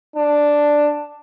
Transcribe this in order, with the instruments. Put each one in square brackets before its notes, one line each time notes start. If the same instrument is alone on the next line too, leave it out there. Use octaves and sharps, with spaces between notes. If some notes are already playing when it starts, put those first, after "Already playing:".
[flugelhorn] D4